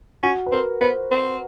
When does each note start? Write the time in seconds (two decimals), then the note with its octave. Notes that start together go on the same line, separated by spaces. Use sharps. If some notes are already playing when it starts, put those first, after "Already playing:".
0.23 C#4 F#4
0.46 B4
0.52 C4 A#4
0.81 B3 C5
1.11 C4